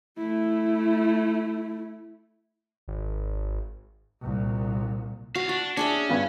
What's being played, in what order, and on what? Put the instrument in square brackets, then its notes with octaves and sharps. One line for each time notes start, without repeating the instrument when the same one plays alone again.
[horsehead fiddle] A3 E4
[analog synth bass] G#1
[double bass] C2 A#2
[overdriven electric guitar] F#2 F5 [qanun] F#4
[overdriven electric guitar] D4 [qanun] F#4
[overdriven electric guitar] C#4 [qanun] D4 G#4 E5
[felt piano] G2 B3 F4